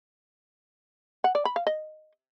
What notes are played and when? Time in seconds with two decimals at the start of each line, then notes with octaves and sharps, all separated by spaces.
1.24 F#5
1.35 D5
1.45 B5
1.56 F5
1.67 D#5